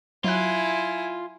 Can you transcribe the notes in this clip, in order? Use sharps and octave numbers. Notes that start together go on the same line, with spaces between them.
F#3 E4 F4 G#5 F#6